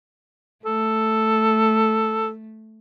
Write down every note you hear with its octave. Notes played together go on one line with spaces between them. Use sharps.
A3 A4